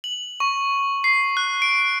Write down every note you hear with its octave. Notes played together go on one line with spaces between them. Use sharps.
F#7
C#6
C7
F#6
D7